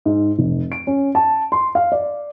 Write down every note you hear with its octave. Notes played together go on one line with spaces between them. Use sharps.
G#2
F1
D7
C#4
A5
C6
F5
D5